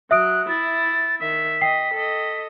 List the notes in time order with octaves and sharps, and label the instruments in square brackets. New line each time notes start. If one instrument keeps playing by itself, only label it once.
[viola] F#3 [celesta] E5 D#6 D7 [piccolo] F#6
[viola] E4 [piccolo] A6
[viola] D#3 E5 [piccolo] B6
[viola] D#5 [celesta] G5 C7
[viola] A4 D#5